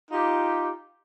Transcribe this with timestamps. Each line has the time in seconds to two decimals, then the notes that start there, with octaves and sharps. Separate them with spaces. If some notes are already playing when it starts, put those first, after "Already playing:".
0.12 D#4 F4 G4